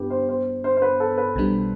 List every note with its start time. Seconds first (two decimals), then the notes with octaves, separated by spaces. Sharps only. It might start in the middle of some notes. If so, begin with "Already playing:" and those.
Already playing: G2 B3 D4 E4 F4 G4 B4
0.10 C5
0.29 C5
0.64 C5
0.77 C5
0.82 B4
1.00 A4
1.18 B4
1.36 B1 B2 G3 D4